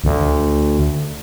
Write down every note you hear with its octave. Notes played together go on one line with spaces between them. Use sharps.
D2